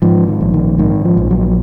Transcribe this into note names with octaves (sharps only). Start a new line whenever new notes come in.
G#2 F3
D#3
A#1
D#3
G#2 D#3
F3
A#1
F#3